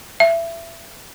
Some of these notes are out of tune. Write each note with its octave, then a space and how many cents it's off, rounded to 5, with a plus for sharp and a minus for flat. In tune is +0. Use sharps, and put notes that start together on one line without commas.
E5 +25